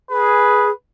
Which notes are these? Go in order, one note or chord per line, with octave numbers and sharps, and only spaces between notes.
G#4 B4